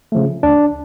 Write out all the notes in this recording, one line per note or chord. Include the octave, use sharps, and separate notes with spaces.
C#3 F3 A3
D2 D4